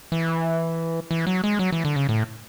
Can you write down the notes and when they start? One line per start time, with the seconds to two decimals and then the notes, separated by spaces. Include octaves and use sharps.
0.12 E3
1.11 E3
1.27 F#3
1.44 G#3
1.59 F#3
1.72 E3
1.85 D3
1.96 C#3
2.09 A2